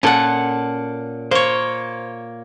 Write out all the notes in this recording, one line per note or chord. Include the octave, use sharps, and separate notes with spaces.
A#2 C#4 A4 F#5
A#3 C5 C#5